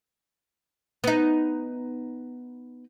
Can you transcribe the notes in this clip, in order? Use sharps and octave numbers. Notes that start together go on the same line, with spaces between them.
B3 D#4